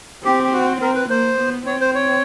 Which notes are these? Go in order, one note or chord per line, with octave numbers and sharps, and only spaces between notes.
C4 G4
G4
F#4
C4 A#4
B4
A#3 C5
B3
C4 C#5
C5
C#5